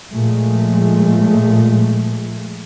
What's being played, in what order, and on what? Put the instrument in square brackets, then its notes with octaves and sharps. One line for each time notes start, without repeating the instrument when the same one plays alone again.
[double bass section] A#2 F3 G#3 A3